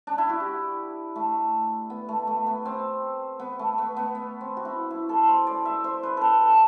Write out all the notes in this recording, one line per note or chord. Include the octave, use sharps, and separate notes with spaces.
D4
E4
F#4
G4
A3
B3
A3
A3
B3
C4
B3
A3
B3
B3
B3
C4
F#4
E4
E4
A4
C5
D5
E5
C5
B4
A4 B4
A4